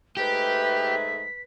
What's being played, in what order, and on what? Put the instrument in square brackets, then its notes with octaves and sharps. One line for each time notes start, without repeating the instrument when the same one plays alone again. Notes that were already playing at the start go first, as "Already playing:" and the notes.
[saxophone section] G#2 A3 [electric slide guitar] G4 [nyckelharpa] B4 [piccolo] B6